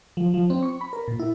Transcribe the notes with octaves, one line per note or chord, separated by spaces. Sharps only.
F3
F3
C4
C#6
B5
A#4
A#2
E4